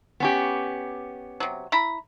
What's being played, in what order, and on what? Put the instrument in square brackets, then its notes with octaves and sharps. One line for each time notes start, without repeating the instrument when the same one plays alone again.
[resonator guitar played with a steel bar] B3 C#4 G4
[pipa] C3 F#3
E4 A#5 B5